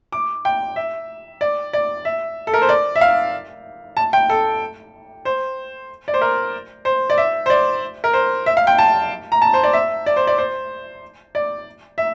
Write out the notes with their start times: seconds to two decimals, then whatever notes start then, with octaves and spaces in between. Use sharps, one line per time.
0.12 D6
0.45 G5
0.76 E5
1.41 D5
1.73 D5
2.05 E5
2.47 A4
2.54 A#4
2.62 C5
2.69 D5
2.96 E5
3.01 F5
3.97 A5
4.13 G5
4.29 A4
5.25 C5
6.08 D5
6.14 C5
6.21 A#4
6.85 C5
7.10 D5
7.18 E5
7.46 C5
7.50 D5
8.04 A#4
8.13 C5
8.46 E5
8.57 F5
8.67 G5
8.78 A5
9.32 A#5
9.42 A5
9.53 C5
9.63 D5
9.73 E5
10.06 D5
10.16 C5
10.27 D5
10.38 C5
11.35 D5
11.98 E5